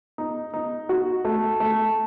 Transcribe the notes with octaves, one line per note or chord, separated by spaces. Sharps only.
D#4
D#4
F#4
A3
A3